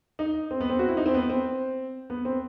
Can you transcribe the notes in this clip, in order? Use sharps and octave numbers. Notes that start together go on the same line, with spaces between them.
D#4
C4
B3
C4
F#4
E4
D#4
C4
B3
C4
B3
C4